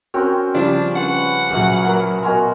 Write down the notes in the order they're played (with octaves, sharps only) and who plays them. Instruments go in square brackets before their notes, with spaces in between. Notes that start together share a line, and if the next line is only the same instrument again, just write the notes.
[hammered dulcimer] C4 C#4 [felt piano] F#4 A#4 G5
[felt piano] C#3 F3 G3 [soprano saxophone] D4
[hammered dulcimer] B4 C#6 [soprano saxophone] F#5
[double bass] A#2 F#3 [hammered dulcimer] G#4 B4 E5
[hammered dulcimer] A#4
[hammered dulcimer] B2 F#4 C6 [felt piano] A#4 G#5